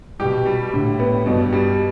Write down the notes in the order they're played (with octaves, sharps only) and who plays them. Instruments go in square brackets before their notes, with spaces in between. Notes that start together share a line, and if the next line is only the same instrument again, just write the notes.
[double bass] B2 [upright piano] G4
[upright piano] G3
[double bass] A2 [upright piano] D3
[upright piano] B3
[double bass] G2 [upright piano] B2
[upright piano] G3